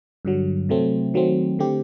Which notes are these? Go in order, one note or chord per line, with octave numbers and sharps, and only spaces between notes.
G2 D3 F#3
C3 F#3 A3 C4
D#3 F#3 A3 C4
D3 A3 C4 G4